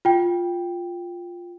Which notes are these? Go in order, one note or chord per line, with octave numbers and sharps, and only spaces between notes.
F4 G5